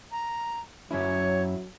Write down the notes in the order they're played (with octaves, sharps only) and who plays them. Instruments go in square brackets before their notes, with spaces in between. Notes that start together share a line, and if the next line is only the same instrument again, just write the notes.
[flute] A#5
[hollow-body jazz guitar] F#2 C#4 E4 [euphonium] F#3 [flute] C#5